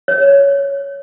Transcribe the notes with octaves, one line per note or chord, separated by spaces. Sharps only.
C#5